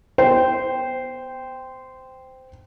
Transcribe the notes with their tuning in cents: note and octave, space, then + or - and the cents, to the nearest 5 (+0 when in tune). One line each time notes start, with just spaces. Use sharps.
B3 +0 C5 -15 G5 +0